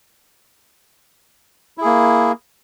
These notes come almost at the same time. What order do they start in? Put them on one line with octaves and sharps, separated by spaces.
E4 G#4 A#3